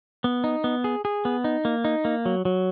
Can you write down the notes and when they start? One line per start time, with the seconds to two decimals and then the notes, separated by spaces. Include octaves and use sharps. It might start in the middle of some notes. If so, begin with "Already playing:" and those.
0.24 B3
0.44 D#4
0.64 B3
0.84 G#4
1.05 G#4
1.25 B3
1.44 D#4
1.65 A#3
1.85 D#4
2.05 A#3
2.26 F#3
2.45 F#3